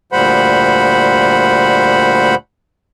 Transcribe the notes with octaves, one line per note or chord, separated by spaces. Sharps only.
D2 A#2 G3 C5 F#5 B5